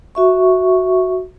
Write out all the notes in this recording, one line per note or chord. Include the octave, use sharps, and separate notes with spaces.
F#4 E5 C#6